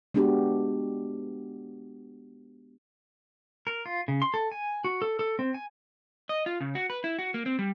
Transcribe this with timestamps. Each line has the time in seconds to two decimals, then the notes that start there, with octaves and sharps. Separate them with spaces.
0.14 G#3 B3 D4 F#4 G4
3.67 A#4
3.86 F4
4.08 C#3
4.22 C6
4.34 A4
4.52 G#5
4.84 F#4
5.02 A4
5.19 A4
5.39 C4
5.54 G#5
6.29 D#5
6.46 F4
6.61 C#3
6.75 F#4
6.90 B4
7.04 E4
7.19 F#4
7.34 A#3
7.46 C4
7.59 G3